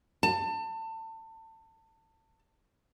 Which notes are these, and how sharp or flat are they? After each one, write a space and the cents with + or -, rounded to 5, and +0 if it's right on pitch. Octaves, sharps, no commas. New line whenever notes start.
A5 +25